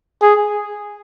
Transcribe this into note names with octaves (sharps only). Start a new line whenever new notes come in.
G#4